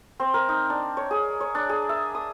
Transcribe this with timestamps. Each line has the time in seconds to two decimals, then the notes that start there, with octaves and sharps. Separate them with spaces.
0.20 C4
0.34 A#4
0.49 D#4
0.70 D4
0.97 C#5
1.11 G#4
1.41 C#5
1.55 D4
1.69 G#4
1.89 E5
2.15 D#6